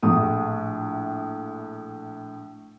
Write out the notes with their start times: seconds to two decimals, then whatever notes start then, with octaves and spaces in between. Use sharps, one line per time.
0.03 A#1 A2 D#6